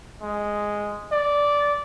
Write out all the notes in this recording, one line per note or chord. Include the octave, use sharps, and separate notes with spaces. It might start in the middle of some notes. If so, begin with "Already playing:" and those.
G#3
D5